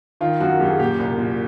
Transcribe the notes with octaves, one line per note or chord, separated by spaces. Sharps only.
D#3 F4
F#2 F#4
F#2 G4
G#4
A#2 G4
C2
A#2